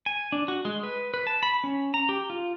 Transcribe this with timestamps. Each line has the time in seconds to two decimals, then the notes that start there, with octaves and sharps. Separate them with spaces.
0.06 G#5
0.32 D4
0.48 F#4
0.65 G#3
0.83 B4
1.14 B4
1.27 A5
1.43 B5
1.64 C#4
1.94 A#5
2.09 G4
2.30 F4